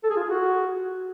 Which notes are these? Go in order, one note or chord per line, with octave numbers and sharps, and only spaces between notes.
A4
G#4
F4
G#4
F#4